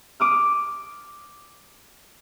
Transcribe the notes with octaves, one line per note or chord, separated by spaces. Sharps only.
D6 D#6 F6